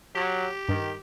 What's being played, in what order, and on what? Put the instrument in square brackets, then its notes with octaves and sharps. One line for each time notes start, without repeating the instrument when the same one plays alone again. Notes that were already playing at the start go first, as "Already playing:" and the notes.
[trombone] F#3 [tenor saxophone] G4
[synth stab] G2 [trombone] D#3